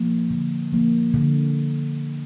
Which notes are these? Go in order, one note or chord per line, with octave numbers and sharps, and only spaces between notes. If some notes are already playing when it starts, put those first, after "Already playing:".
Already playing: F3 A#3
D3
F3 A#3
D3